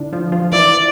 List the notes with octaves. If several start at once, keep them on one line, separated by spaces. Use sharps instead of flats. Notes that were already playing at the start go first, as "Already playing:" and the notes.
Already playing: D3 D4 E4
F3 F4
F3 F4
E3 E4 D5